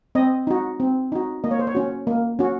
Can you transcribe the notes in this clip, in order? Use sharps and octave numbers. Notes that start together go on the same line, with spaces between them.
C4 D#5
D#4 F#4
C4
D#4 F#4
A#3 D#5
C#5
C5
C#5
C#4 F#4
A#3
C#4 F#4